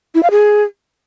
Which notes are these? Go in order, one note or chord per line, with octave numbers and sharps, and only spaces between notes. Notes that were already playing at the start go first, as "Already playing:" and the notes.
E4
F5
G#4